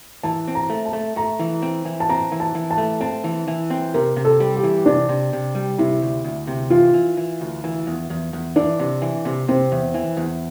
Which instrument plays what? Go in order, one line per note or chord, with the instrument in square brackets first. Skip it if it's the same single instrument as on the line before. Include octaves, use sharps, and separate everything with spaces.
[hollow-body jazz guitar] E3 [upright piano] A5
[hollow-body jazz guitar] C4
[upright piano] A#5
[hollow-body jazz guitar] A3
[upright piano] A5
[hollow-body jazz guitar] A3
[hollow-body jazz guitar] A3 [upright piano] A#5
[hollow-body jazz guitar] E3
C4
E3
[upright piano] A5
[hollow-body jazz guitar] C4 [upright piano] A#5
[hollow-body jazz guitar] E3
[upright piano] A5
[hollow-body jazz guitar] E3
[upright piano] A5
[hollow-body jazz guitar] A3
[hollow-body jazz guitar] C4 [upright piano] A5
[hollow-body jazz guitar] E3
E3
C4
[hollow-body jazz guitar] C3 [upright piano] A#4
[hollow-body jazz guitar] C3
[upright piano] A4
[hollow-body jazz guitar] G3
[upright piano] G4
[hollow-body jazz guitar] E3
[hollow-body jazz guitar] C3 [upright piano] D4
[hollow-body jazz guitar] C3
C3
G3
[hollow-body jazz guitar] C3 [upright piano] E4
[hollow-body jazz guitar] D2
D2
C3
[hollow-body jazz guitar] E3 [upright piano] F4
[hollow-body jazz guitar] E3
E3
D2
E3
E2
E2
E2
[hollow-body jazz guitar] E3 [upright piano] D4
[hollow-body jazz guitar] C3
E3
C3
[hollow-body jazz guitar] C3 [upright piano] C4
[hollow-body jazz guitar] E2
E3
E2